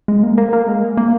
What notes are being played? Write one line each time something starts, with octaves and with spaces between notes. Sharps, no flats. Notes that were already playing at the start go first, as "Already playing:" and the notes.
G#3
A#3
A#3
A#3
G#3
A#3